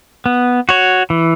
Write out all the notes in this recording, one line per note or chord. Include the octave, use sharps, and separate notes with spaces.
B3
F#4 C#5
E3